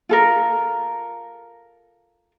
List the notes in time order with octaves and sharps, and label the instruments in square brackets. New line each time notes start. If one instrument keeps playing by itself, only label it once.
[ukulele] F4 A4 A#4